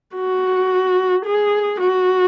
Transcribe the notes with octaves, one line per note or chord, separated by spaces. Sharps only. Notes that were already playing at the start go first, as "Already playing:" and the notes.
F#4
G#4
F#4